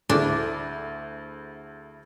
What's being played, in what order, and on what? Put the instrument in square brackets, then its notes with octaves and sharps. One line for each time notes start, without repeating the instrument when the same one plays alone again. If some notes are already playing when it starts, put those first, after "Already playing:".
[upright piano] D2 A3 [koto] D4 [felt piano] E4 G#4 A4